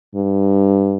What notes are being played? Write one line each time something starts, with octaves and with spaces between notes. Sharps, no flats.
G2